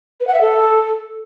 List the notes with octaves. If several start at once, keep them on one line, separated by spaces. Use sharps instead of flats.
B4
F#5
E5
A4